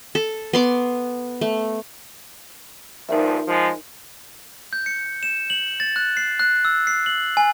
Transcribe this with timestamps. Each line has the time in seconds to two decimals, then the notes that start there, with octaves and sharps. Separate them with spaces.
0.15 A4
0.53 B3 C6 D6
1.41 A3
3.09 A#1 G2 F3 D#4 A#4 E5
3.48 F3 G#3
4.73 G6
4.86 C#7
5.23 E7
5.50 F#7
5.80 A6
5.96 F#6
6.17 C7
6.40 F#6
6.65 E6
6.87 C7
7.06 F#7
7.37 G#5